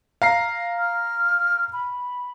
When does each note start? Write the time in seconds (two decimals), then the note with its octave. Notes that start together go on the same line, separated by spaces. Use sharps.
0.22 F5 A#5 C7
0.79 F6
1.73 B5